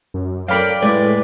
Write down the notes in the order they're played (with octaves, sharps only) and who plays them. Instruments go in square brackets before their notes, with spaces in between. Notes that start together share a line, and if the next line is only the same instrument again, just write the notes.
[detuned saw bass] F#2
[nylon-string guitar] F#3 A4 A#4 [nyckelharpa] D5 G5 [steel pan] F5 B5
[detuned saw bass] A2 [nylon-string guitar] G#3 E4 [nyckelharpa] B4 [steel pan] D5